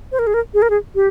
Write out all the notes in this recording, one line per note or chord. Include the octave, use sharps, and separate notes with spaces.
C5
A#4
G#4
A#4
G#4
A#4
G#4
G4